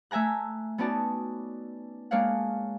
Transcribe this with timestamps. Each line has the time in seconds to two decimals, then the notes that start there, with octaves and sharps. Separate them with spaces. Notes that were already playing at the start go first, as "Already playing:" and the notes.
0.11 A3 E5 G#5 A#5 F#6
0.78 B3 C#4 D#4 F#4 D5 A5
2.11 G#3 A#3 D4 C#5 F5 F#5